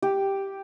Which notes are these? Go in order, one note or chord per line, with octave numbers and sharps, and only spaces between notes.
G4